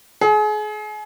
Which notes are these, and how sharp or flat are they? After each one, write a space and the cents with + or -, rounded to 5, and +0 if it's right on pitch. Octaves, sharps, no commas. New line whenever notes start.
G#4 +35